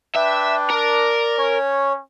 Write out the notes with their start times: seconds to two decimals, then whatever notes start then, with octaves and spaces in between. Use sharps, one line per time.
0.16 D4 B4 E5 G5
0.70 A#4 D5
1.38 C#4 C#5